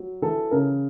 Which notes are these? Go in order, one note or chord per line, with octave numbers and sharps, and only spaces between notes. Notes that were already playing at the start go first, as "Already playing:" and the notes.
Already playing: F#3
E3 A4
C#3 A#4